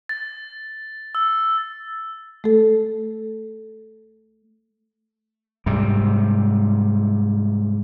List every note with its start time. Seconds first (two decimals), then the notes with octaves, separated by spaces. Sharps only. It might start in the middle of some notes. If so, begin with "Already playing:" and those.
0.09 A6
1.15 E6
2.44 A3 A4
5.66 G#2 C3 G3